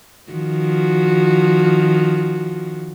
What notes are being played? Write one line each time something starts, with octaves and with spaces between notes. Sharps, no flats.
D#3 F3 F#4